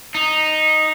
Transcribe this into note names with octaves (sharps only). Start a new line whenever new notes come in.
D#4